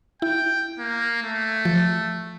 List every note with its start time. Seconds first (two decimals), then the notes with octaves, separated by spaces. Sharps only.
0.22 E4 G5
0.79 A#3
1.23 A3
1.65 F3